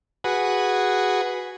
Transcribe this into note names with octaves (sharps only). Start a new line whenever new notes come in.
F#4 G#4 B4